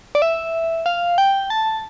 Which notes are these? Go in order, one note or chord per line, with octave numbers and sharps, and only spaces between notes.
D5
E5
F5
G5
A5